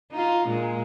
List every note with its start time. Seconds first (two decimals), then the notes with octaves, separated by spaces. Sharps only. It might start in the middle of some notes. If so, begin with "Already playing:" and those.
0.12 D#4 F4
0.48 A#2 G#3